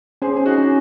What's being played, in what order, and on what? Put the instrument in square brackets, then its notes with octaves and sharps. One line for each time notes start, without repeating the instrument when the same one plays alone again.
[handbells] C#4 [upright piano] G#4 C5
[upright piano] G#4
D#4 F#4
[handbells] C#4